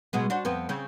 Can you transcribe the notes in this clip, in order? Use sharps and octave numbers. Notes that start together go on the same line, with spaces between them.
B2 G#3 B3
D4 F#4 C5
F2 B3 C4
C#3 C4